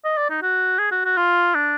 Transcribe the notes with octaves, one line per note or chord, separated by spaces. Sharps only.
D#5
D5
D#4
F#4
G#4
F#4
F#4
F4
D4